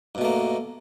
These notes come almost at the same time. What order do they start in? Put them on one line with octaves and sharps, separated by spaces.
G2 B2 A3 A#3